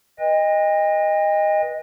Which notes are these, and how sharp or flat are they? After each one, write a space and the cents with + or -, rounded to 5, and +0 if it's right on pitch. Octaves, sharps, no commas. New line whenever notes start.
B4 -25 D#5 +0 G5 +45